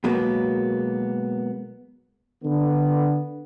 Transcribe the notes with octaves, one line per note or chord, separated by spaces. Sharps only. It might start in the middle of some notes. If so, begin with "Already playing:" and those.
B2 F#3 G#3 A#3 B3
D3 B3